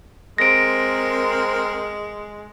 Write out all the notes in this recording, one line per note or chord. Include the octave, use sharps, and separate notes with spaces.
G#3 C4 A#4 A#6 D7